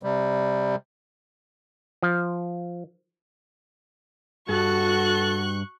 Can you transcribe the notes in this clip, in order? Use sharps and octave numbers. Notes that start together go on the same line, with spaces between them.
C3 G3
F3
G2 F#4 A4 C#6 F#6